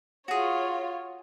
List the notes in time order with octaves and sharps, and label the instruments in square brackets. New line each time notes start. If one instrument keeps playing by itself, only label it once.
[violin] F4 C#5 [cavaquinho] F#4 G#4